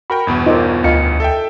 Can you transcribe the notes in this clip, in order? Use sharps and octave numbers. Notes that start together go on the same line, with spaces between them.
F#4 A#4 G5 B5
G1 E2 B2
D#4 F4 A#4 C5 D5 D#5
D2 D4 F4 D#5 F5 C#7
A4 E5 G5